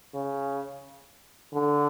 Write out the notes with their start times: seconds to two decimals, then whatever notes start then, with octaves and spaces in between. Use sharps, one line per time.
0.15 C#3
1.54 D3